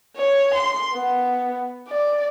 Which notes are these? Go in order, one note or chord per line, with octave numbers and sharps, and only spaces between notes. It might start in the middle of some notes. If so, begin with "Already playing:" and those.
C#5
C6
B3
D5